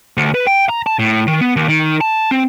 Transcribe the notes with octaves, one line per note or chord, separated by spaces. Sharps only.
D2
B4
G5
A#5
A5
A2
D#3
B3
D#2
D#3
A5
C4